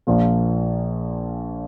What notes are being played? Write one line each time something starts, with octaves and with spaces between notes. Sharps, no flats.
A#1 A#2 F3 A#3